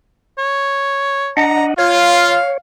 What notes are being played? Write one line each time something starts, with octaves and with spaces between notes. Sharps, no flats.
C#5
D4 D#5 F#5 A#5
F4 C#5 F5